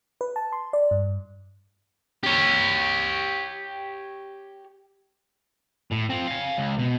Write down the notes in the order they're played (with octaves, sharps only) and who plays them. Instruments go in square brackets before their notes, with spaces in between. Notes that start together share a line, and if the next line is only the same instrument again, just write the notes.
[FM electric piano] B4
A5
C6
D5
G2
[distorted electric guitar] G4 C#5
A2
F3 C4
F5 G#5
C#2
B2